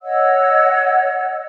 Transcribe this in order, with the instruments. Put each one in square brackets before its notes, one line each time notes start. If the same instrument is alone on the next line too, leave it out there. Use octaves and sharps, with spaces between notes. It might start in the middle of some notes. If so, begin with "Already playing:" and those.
[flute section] C#5 D#5 F#5 E6